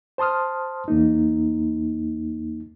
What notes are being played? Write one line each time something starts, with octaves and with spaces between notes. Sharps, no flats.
C5 A5 C6 D#6 F6
E2 A#3 D#4